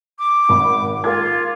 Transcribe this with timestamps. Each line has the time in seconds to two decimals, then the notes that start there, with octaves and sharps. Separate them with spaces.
0.19 D6
0.49 G#1 B5
1.04 F4 A#4 D6 G#6